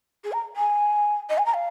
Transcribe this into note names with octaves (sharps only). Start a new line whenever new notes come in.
G#4
A#5
G#5
D#5
G#5
A#5
F5